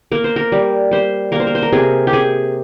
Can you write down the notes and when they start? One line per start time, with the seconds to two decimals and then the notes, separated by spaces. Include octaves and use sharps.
0.12 A#3 A#4
0.24 C5
0.36 A#4
0.52 G3
0.91 G3 C5
1.32 A#3 A#4
1.40 C5
1.47 A#4
1.55 C5
1.63 A#4
1.73 C3 G#4
2.07 G4
2.13 C3 G#4